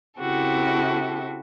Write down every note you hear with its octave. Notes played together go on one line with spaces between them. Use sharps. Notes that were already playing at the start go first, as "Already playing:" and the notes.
C#3 C4 E4 F#4 G4 A4